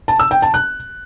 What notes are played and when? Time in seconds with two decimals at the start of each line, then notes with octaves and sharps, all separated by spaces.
0.08 A5
0.20 E6
0.31 G5
0.42 A5
0.54 F#6